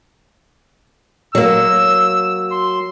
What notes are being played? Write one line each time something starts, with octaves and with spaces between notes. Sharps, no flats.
F#3 A#3 E6
C6